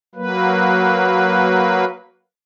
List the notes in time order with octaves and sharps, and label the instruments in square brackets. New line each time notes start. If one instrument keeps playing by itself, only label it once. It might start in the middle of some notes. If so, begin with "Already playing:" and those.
[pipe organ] F#3 A#3 B4